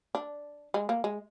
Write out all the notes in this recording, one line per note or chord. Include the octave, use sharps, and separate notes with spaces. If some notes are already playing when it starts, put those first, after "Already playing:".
D4
G#3
A#3
G#3